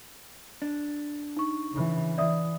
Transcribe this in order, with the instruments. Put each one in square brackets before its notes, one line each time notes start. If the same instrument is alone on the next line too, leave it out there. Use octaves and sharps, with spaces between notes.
[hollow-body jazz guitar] D4
[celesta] D#4 C#6
[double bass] C#3 E3
[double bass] E3 [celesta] D5 E5 D#6